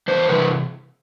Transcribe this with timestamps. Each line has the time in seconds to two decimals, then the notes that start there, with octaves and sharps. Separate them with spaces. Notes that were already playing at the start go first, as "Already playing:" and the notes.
0.08 E2 C5
0.29 C3 E3 B4